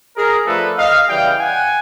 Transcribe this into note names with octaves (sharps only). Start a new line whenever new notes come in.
G#4 A#4
F3 A3 D4 A4 B4
D#5 F5
C#3 E3 G3 F5 G5
F#5 G#5